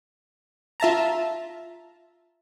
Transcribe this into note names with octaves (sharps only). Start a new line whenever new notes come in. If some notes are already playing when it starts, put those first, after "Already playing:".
F4 E5 A5 A#5